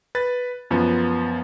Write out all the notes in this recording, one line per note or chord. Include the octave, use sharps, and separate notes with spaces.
B4 A6
F#2 F3 B3